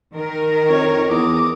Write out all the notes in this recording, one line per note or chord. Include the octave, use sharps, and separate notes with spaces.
D#3 A#4
F2 C#5
E2 D6 D#6